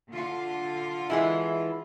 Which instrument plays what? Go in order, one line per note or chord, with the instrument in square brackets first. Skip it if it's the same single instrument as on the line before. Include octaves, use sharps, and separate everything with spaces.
[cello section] D3 F4
[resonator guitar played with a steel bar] E3 G#3 E4